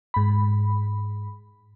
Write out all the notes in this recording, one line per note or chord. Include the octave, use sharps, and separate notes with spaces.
G#2 B5